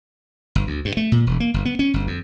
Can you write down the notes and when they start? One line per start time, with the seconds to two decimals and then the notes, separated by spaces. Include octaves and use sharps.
0.55 G1
0.67 D2
0.85 G2
0.97 A3
1.12 A#2
1.27 E1
1.40 A#3
1.54 G1
1.65 B3
1.79 C#4
1.94 G1
2.07 F2